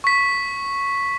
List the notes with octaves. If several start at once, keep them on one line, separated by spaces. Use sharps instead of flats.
C#6 B6